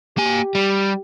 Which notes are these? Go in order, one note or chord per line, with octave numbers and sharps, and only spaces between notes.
A#3 G4 G#5
G3